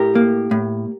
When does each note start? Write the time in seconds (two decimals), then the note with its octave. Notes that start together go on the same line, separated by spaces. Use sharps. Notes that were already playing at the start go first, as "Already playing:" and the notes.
Already playing: A2 G4 A#4
0.15 A#3
0.51 A2